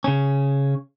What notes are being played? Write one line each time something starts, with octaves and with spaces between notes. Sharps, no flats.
C#3 C#4